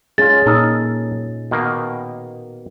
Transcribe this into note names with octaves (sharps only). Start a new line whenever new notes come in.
G#3 C#4 F4 G#4 A6
A#2 D#4 A4 A#4 D#5
B2 D#3 A#3